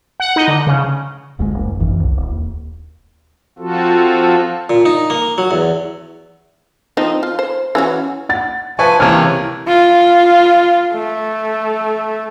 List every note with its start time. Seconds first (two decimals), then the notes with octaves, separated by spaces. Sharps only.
0.20 F#5
0.36 D#4
0.48 D3
0.67 C#3
1.39 D#1 D2 A2 G#3
1.54 F#1
1.80 G#1 F#2 D#3 E3
2.00 C2
2.17 D1
2.31 D#2
3.59 F3 C4 F4 F#4 A4
4.70 A#2
4.85 D#4
5.10 A#3
5.38 F#3
5.51 E2
6.97 F3 C4 D#4
7.23 F4
7.39 C5
7.75 E3 C#4 F#4
8.29 F#5 A6
8.79 F3 B4 E5 G#5 A5 C#6
9.00 C#2 C3 E3 A#3 C#5 A5 F6
9.68 F4
10.93 A3